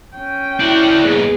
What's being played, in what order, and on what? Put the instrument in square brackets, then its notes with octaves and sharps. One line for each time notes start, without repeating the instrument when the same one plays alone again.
[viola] C#4 G5
[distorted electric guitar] D4 F#4 [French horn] E4
[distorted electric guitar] D#2 G#2 [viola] B3 G#4